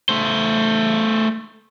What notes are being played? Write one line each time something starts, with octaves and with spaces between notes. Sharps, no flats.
A3 C5